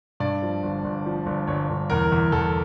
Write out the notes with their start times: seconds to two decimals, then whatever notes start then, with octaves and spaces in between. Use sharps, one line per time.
0.20 G2 D5
0.42 F3
0.63 G1
0.84 G1
1.06 F3
1.26 G1
1.47 G1 C#5
1.69 G1
1.90 E2 A#4
2.12 E2
2.32 E2 A4